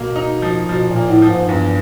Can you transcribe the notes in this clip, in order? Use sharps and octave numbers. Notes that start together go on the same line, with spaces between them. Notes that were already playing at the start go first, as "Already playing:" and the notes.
Already playing: B2 A#3
D#4
F3
B2 F3
A#2
A#3
A2
F3
G#2
E2 G2